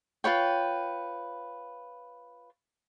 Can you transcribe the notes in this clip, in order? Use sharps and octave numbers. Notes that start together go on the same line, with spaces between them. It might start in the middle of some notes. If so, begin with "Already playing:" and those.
F4 B4 C#5 G5